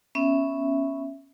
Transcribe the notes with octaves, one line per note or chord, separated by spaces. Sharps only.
B3 C#4 E5